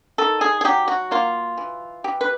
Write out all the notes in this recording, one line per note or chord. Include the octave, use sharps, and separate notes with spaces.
D#3 A4
G#4
G#4
F#3 G4
F#4
A#3 F4
E3
E3 G4
B4